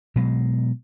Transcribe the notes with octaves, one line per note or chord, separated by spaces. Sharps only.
B2 F#3 G#3